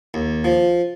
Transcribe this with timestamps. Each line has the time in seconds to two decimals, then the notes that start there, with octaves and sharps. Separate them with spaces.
0.14 D#2
0.44 F3